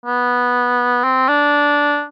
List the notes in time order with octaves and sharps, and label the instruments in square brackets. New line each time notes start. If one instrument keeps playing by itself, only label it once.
[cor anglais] B3
C4
D4